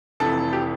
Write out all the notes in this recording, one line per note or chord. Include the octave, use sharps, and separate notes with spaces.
F1 F2 C3 E3 A4
G4